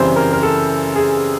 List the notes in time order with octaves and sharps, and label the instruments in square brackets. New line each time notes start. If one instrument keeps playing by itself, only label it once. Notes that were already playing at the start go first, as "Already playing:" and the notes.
Already playing: [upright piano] F#2 C#3 E3 G3 C4 C5
A#4
A#4
A4
G#4